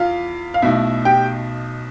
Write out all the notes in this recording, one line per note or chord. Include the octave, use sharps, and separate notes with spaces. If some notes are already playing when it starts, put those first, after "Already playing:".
Already playing: E2 F4 F5
F5
B1 B2 A3 E4 E5
G4 G5